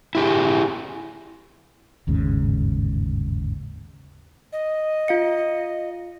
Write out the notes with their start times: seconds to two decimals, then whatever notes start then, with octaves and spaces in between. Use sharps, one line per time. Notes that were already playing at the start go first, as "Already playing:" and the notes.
0.15 E4 G4 G#4
2.07 G1 D#2 G#2 C#3
4.53 D#5
5.08 F4 F5 C#7